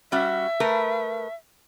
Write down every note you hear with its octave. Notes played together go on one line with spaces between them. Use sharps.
G3 C#4 F#4 E5
A3 A#4 B4